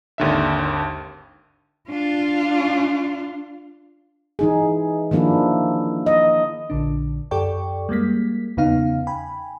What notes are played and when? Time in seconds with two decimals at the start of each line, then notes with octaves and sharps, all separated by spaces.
0.18 G#1 D#2 D3 E5
1.89 D4 F4
4.39 E3 D#4 G#4
5.11 D#3 F3 A#3 D4 E4
6.06 D#5
6.70 A#1 D3 D4
7.31 F#2 G4 A4 D5 G5 C#6
7.89 G3 G#3 A#3 B6
8.57 E2 C#3 B3 D#4 F5
9.07 G5 G#5 B5